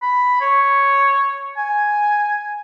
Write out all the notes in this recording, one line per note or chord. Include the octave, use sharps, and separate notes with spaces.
B5
C#5
G#5